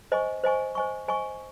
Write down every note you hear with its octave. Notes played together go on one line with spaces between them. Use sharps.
C5 D#5 G#5 C#6
C5 D#5 G#5 C#6
C5 D#5 G#5 C#6
C5 D#5 G#5 C#6